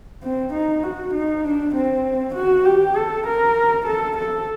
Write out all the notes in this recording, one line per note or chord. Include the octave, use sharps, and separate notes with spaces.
C4
D#4
F#4
D#4
D4
C4
F#4
G4
A4
A#4
A4
A4